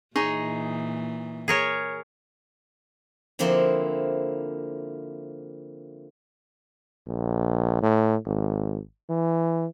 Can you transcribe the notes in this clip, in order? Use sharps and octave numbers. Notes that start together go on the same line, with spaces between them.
A#2 E3 D#4 G#4 C#5
G#4 A#4 C#5
D3 F3 A#3 C4 E4 C6
A#1
A2
G#1
E3